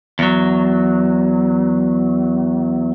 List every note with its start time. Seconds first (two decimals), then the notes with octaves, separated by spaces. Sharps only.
0.19 E2 F#3